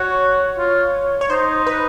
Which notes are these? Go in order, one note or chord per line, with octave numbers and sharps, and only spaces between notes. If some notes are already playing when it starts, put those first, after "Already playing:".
Already playing: F#4 C#5
F4
C#5
D#4 C5
B4